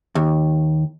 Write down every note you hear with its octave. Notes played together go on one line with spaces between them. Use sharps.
D#2